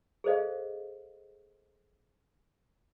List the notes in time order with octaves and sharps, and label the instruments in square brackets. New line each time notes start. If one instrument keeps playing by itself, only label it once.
[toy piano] G#4 A4 C5 D#5 F5